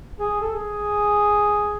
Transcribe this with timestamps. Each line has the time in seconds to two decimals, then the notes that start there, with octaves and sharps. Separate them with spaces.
0.20 G#4
0.41 A4
0.53 G#4